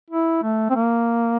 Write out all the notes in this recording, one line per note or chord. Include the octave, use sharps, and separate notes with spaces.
E4
A3
C4
A#3